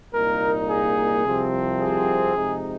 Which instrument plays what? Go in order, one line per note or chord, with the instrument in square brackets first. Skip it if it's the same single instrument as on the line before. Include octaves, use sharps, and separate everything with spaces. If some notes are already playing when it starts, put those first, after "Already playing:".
[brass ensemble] C2 A#2 A#3 D#4 [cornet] A#4
[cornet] G#4
[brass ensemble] C2 C3 F3 C4
[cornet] G#4
[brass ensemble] F2 C3 G#3 D#4